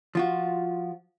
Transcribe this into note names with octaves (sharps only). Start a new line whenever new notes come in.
F3 F4 F#4